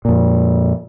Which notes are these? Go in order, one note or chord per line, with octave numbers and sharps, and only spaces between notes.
F2 A#2